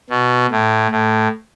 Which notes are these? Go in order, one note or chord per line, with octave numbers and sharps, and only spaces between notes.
B2
A2
A2